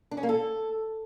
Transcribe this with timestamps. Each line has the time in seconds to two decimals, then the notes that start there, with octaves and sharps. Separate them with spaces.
0.11 D4
0.17 C#4
0.23 A#3
0.29 A4